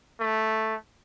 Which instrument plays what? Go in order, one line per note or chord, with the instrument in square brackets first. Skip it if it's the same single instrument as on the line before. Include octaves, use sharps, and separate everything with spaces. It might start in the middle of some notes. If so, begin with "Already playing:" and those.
[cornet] A3